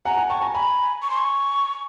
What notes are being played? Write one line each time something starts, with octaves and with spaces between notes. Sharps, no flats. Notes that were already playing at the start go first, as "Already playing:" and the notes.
F#5 G#5 A#5
F#5 G#5
G5 A5 C#6
G#5 A#5
G#5 A#5 B5
C#6
C6
C#6